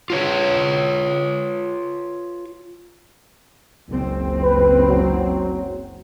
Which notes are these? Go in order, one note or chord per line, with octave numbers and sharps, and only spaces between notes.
F4 B4 C#5
F#1 C#2 C4
B4
F#3